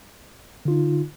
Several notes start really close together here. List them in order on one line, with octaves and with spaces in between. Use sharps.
D3 F4 D#4